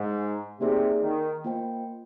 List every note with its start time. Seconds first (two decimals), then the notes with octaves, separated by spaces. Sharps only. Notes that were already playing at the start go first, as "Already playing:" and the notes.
Already playing: G#2
0.61 C3 A#3 D#4 G#4 D5
1.02 D#3
1.44 A#3 F4 C5 D#5 G5